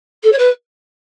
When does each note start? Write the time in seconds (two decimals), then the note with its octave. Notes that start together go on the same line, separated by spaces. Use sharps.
0.23 A4
0.32 C#5
0.38 B4